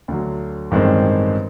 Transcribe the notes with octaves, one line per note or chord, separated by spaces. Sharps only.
D2 D3 F#3
A1 G2 D#3 G#3 C4